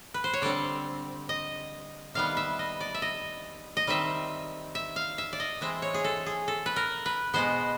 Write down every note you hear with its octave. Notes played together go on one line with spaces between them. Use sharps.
B4
C5
C#5
D3 G3 C4 D5
D#5
C3 D#3 G3 B3 F5
E5
D#5
D5
E5
D#5
D#5
D#3 G3 C4 E5
E5
F5
E5
D5
D#5
E3 G#3 C4 E5
C#5
G#4
A4
G#4
A4
B4
A#4
B4
B2 G#3 B3 C5